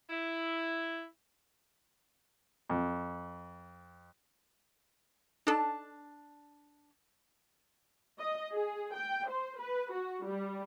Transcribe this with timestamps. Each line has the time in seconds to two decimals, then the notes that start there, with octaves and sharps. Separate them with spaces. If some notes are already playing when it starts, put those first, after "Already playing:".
0.10 E4
2.70 F2
5.47 D4 D#4 A4 A5
8.19 D#5
8.52 G#4
8.93 G5
9.28 C5
9.58 B4
9.92 F#4
10.24 G3